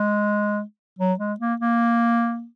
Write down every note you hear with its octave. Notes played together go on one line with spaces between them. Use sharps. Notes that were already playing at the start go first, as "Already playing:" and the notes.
Already playing: G#3
F#3
G#3
A#3
A#3